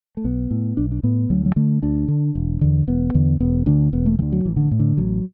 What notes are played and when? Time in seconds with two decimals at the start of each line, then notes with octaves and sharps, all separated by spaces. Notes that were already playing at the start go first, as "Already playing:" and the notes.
0.17 A3
0.24 B1 B3
0.51 A2
0.77 B1 D4
0.92 D4
1.03 A2 B3
1.30 D2 F#3
1.46 F#3
1.56 D3 A3
1.82 D2 D4
2.08 D3
2.35 E1
2.61 E2 D3
2.87 E1 B3
3.14 E2 D3
3.40 E1 B3
3.66 D2 D3 D4
3.93 E1 B3
4.06 A3
4.19 D2 D3 E3
4.32 F#3
4.45 A1 E3
4.56 D3
4.71 A2
4.79 D3
4.97 A1 F#3